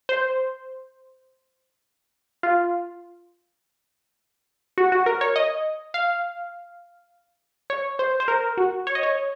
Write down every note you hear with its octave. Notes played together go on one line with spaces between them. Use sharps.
C5
F4
F#4
F#4
A#4
C#5
D#5
F5
C#5
C5
C5
A#4
F#4
C#5
D#5
C#5